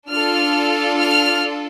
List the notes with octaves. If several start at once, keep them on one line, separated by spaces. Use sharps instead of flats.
D4 F4 A4 F6
F6